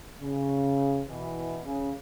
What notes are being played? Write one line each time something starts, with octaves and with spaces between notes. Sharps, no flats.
C#3
B2 E3
C#3